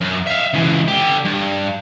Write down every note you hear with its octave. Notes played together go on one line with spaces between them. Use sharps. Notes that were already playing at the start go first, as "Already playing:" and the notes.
F#2
E5 F5
C#2 E3
D3 G4
G2